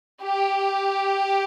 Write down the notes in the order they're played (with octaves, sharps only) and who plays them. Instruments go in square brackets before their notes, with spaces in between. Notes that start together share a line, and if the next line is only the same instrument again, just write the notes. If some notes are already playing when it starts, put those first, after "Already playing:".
[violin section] G4